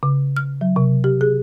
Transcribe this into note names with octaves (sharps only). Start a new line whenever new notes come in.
C#3
F6
F#3
C3
G4
G#4